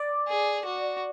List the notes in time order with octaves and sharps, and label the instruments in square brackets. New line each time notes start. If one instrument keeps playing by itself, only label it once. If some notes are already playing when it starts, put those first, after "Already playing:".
Already playing: [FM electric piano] D5
[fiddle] G#4
F#4